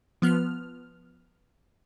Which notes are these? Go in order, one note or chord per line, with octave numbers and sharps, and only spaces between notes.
F3 B3 F6